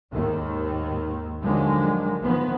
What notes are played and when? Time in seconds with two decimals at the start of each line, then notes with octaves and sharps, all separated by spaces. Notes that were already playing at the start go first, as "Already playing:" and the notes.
0.11 D#2 G#2 D#3
1.42 D3 D#3 F3 F#3 G#3
2.21 D#3 F3 B3